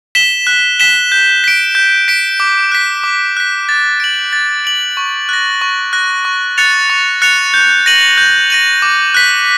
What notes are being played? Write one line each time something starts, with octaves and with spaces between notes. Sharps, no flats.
B6 E7 G7
F#6
B6 E7 G7
G6
B6 D7
G6
B6 D7
D6
F#6 B6
D6
F#6 B6
A6
D7 F#7
A6
D7 F#7
C#6
F#6 A#6
C#6
F#6 A#6
C#6
F#6 A6 C#7 F7
C#6
F#6 A6 C#7 F7
G6
A#6 D#7 F#7
G6
A#6 D#7 F#7
D6
F#6 B6